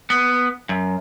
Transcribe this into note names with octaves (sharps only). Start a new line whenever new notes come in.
B3
F#2